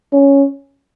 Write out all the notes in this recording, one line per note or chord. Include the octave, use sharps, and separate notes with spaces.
C#4